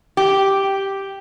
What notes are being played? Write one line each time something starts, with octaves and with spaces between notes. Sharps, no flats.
G4